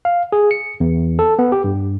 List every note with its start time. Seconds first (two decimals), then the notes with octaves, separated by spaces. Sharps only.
0.05 F5
0.32 G#4
0.51 C#7
0.80 E2
1.19 A4
1.39 B3
1.52 G4
1.64 G2